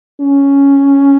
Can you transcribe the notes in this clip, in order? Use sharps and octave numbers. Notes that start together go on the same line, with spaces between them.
C#4